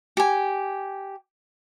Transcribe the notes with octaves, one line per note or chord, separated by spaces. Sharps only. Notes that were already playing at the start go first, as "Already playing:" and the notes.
G4 G#5